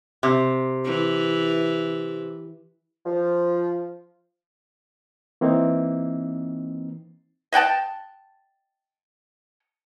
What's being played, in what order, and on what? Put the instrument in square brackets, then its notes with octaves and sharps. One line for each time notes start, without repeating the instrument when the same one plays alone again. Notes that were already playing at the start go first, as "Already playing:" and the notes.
[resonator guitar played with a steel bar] C3
[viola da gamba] E3
[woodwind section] F3
[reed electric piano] E3 A#3 C4 D#4
[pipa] D#5 F#5 G5 A5